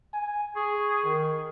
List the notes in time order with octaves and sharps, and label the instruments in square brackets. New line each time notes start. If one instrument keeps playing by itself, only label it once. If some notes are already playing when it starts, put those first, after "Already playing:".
[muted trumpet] G#5
[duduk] G#4 [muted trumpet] C#6
[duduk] D#3